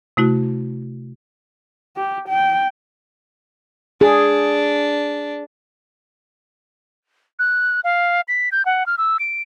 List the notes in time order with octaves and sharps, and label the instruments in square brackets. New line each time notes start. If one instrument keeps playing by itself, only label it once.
[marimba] C3 A3 E4 F#4
[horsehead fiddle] G4
G5
[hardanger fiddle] D4 [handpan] G#4
[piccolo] F#6
F5
B6
G6
F#5
F6
E6
D7